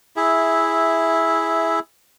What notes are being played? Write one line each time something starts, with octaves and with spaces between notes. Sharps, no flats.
E4 G#4 E5